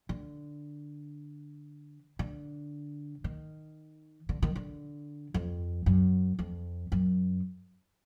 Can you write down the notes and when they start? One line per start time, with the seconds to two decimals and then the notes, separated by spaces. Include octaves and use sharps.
0.09 D3
2.19 D3
3.24 D#3
4.29 D3
4.42 D#3
4.56 D3
5.34 F2
5.86 F#2
6.39 F2
6.92 F#2